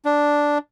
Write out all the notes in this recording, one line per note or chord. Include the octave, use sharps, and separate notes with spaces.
D4